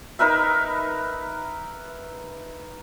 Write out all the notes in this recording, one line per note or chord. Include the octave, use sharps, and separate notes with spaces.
D#4 A#4 B4 E5